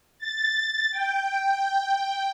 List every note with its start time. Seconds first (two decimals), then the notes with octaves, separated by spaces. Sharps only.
0.19 A6
0.91 G5